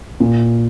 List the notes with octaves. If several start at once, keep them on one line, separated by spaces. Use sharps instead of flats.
A#2